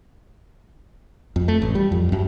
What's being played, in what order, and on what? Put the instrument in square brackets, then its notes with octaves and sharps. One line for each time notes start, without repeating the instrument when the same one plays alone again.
[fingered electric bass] F2
A3
A1
G3
F2
F#2